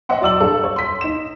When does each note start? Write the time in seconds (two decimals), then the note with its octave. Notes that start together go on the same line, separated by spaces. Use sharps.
0.09 C#5 D#5 E5 F#5 C6
0.21 F#3 D5 E6 F#7
0.40 G2 A4 F5
0.64 C#5
0.76 C6 B6
1.01 D#4 E7